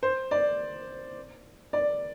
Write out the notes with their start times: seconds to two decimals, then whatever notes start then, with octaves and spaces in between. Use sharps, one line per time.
0.03 C5
0.31 D5
1.73 D5